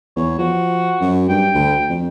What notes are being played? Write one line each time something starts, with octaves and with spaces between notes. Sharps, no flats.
E2 C#5
F3 F#4
F#2
G2 G5
D2
F2